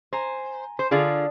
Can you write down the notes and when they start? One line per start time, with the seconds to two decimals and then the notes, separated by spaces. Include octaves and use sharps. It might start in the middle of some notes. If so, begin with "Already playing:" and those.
0.13 C5 G#5 A#5
0.79 C5
0.91 D3 F4 G#4 D5 A5 D#6